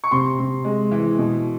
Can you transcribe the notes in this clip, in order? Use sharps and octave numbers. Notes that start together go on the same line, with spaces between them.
C#6
C3 C6
C3
G#3
E3
B2